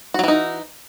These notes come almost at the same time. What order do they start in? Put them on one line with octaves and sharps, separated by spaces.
F#4 F#3 E3 D#4